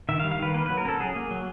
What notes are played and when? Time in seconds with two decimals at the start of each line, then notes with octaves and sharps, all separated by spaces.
0.09 D#3 E5
0.20 F5
0.24 G3
0.31 F5
0.39 D#3 B4
0.54 A#3 B4
0.66 F#3 B4
0.77 A#4
0.85 C#4 A4
1.00 F#3 G#4
1.15 A#3
1.31 F#3